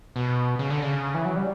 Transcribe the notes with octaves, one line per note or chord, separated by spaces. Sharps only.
B2
C#3
D3
C#3
E3
F#3
G3